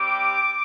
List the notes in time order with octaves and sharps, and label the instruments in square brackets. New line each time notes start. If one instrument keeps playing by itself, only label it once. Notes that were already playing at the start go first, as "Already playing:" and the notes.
Already playing: [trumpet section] G3 C4 G4 D6